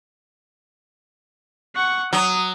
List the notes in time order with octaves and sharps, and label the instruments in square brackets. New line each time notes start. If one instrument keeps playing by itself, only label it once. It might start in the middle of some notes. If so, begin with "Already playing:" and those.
[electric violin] F#5 C#6
[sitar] F#3 [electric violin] D#6